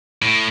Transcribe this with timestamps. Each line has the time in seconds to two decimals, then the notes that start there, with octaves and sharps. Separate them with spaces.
0.22 A2